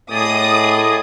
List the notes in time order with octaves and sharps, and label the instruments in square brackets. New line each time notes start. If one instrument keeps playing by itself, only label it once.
[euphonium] A2 [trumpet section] G#4 D5 D#5 [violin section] D#6